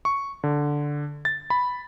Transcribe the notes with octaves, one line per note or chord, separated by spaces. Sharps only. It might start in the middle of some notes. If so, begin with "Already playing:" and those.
C#6
D3
A6
B5